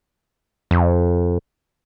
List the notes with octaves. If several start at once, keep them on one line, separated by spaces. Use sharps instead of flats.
F2